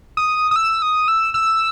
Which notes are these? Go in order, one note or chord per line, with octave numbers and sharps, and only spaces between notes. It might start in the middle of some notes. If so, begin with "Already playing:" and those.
D#6
D#6
E6
D#6
E6
E6